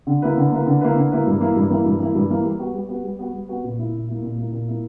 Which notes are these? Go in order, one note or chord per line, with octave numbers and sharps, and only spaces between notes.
D3
A#3 E4 B4
D3
A#3 E4 B4
D3
A#3 E4 B4
D3
A#3 E4 B4
G2
E3 A#3 E4
G2
E3 A#3 E4
G2
E3 A#3 E4
G2
E3 A#3 E4
G3
B3 F#4 B4
G3
B3 F#4 B4
G3
B3 F#4 B4
G3
B3 F#4 B4
A#2
A#3 E4
A#2
A#3 E4
A#2
A#3 E4
A#2
A#3 E4